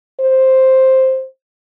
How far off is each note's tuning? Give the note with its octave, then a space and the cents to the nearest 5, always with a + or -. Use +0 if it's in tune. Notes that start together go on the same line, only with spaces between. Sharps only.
C5 +5